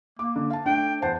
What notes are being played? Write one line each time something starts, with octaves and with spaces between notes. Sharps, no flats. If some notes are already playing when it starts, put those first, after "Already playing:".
A#3 D6
D3
F5 A5
A3 D4 G5
E2 C5 F#5 A5